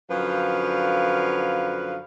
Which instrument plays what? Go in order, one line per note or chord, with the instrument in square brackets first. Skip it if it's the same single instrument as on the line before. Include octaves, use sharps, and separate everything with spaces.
[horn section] F#2 D3 F3 B4 F5